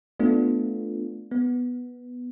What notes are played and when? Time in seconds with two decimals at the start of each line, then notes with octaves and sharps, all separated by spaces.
0.20 A3 B3 D4 F4
1.31 B3